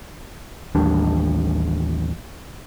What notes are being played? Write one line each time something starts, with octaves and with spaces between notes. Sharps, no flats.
A1 D#2 G3 D4